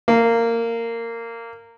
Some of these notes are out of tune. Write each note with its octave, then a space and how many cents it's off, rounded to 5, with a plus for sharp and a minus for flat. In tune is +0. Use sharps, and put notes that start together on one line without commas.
A#3 -15